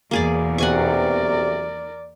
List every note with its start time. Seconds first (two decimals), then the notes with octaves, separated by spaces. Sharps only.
0.11 E2 B2 A#3 G#4 D5
0.58 B1 C3 A#4 D5 F#5 G#5 C#6